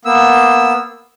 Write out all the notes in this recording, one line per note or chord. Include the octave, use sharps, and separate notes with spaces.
A#3 B3 E6